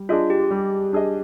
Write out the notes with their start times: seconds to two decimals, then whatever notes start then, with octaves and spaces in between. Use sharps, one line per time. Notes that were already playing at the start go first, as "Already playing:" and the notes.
Already playing: G3
0.09 D4 F4 G#4 D#5
0.30 G4
0.51 G3
0.93 D4 G#4 D#5